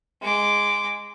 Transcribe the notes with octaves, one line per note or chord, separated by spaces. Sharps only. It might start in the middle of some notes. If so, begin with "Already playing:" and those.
G#3 D6